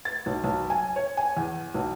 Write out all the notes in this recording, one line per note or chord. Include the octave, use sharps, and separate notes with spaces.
A6
B1
B1
G#5
C#5
G#5
E2
B1